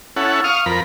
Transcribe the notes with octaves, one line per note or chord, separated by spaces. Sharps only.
C#4 E4 A4 F#5
F5 C#6 D#6 F6
F2 A#4 B5